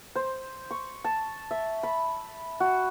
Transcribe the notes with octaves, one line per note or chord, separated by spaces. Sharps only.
C5
C#6
A5
E5
B5
F#4